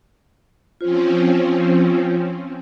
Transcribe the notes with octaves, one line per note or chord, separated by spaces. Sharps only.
F3 C4 C#4 F4 C5